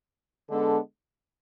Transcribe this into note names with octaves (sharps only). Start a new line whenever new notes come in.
D3 G#3 B3 D4 A4